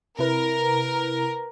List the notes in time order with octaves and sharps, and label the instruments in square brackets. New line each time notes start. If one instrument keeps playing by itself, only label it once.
[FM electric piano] C3 E4 B4 [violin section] A#4